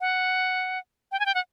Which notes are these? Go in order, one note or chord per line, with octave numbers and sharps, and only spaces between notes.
F#5
G5
G#5
G5
F#5